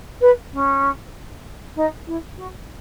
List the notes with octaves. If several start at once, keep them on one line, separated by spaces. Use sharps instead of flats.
B4
C#4
D#4
E4
F#4